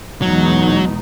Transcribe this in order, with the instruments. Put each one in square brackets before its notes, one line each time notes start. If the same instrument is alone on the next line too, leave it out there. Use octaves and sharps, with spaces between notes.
[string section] E2 B2 G#3 D#4 [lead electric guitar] F#3